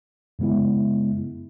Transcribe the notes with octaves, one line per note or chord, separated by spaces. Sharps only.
F#2 C#3 G#3 B3 E4